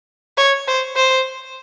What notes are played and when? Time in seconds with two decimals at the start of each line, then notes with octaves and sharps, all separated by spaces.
0.37 C#5
0.67 C5
0.96 C5